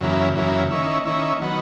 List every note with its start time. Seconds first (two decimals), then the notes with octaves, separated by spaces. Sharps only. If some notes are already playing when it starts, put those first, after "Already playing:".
0.01 F#2 C#3 E3 A#3
0.35 F#2 C#3 E3 A#3
0.70 D#3 A#3 C#4 E4
1.05 D#3 A#3 C#4 E4
1.42 D#3 F#3 B3